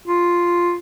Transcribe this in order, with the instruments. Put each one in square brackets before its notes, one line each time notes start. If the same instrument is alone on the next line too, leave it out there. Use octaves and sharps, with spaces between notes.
[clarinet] F4